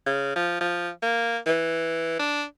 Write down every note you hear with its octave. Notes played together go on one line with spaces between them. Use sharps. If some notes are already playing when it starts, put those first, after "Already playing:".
C#3
F3
F3
A#3
E3
D4